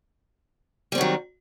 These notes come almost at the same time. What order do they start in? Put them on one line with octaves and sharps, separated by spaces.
G3 C4 F#3 D#3